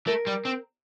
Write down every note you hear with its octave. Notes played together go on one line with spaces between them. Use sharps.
A3 A#4
G3
C4